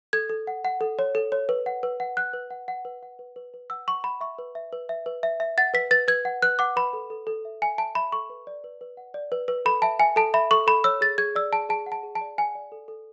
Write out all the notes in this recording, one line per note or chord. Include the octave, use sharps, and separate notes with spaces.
A4 G#6
A4
F#5
F#5
A4
C#5
A4
C#5
B4
F#5
B4
F#5
F#5 F#6
B4
F#5
F#5
B4
F#5
B4
B4
B4
F#5 E6
F#5 C#6
F#5 B5
E5 C#6
B4
E5
B4
E5
B4
E5
E5
F#5 A6
B4 B6
B4 A6
B4 G#6
F#5
B4 F#6
F#5 D6
B4 B5
A4
A4
A4
E5
E5 G#5
E5 A5
E5 B5
A4 C#6
B4
D5
B4
B4
F#5
D5
B4
B4
A4 B5
E5 A5
E5 G#5
A4 A5
E5 B5
A4 C#6
A4 B5
C#5 E6
G#4 A6
G#4 G#6
D5 E6
G#4 A5
G#4 A5
F#5
A5
G#4
A5
D5
F#5 G#5
D5
A4
A4